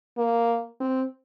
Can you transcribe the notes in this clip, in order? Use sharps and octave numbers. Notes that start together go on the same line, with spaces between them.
A#3
C4